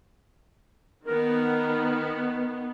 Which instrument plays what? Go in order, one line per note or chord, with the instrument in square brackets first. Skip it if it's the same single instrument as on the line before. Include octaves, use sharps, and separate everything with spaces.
[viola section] D#3 B3 [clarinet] A#4